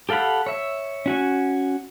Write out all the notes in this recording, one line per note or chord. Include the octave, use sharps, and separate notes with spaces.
G4 A4 F5 F#5 B5
C#5 E5
C#4 F#4 G#5